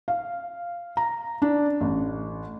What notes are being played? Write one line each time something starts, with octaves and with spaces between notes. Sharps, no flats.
F5
A#5
D4
A1